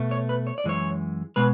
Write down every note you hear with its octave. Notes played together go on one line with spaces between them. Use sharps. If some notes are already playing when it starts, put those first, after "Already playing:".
Already playing: B2 A3
C#5
B4
C#5
D5
F#2 E3 G#3 C#5
B2 G#3 B4